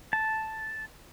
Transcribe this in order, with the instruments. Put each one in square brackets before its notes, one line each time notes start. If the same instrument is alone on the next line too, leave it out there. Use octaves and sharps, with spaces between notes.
[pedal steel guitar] A5